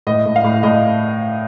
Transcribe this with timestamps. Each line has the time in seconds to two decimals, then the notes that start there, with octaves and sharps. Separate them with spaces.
0.07 A2 D#5
0.26 A2
0.36 F5
0.44 A2
0.63 A2 D#5